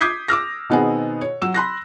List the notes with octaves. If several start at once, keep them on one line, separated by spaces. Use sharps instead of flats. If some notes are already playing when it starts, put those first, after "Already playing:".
D6 D#6 G6 G#6 B6 C7
D6 E6 F6 A#6
B2 D#3 B3 C4 G#4
C#5
F#3 E6 E7
B5 C6 F#6 A#6